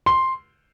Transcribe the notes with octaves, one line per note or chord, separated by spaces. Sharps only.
C6